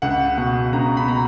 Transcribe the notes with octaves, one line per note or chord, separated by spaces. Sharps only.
C#2 F#5
B2 F#5
C#2 A#5
B5
B2 A#5